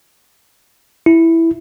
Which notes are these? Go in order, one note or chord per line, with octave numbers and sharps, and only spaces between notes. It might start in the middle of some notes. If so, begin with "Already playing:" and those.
E4